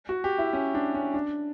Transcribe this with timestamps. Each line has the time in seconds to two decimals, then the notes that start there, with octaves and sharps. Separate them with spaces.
0.09 F#4
0.24 G4
0.39 E4
0.53 C#4
0.74 D4
0.95 C#4
1.14 D4